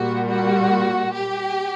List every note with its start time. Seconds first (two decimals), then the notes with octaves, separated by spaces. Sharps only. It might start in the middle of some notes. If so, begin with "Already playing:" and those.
Already playing: A#2 G3 F#4
0.30 F#4
1.14 G4